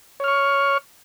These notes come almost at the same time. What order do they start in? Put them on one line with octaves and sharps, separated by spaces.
C#5 F6 C#6